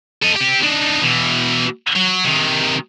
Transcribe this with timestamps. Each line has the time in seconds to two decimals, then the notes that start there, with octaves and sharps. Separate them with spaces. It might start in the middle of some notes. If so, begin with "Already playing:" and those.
0.23 A4 D#5
0.36 C4 G4
0.63 D4 D#4
1.02 B2 E3
1.96 F#3
2.25 C3 D#3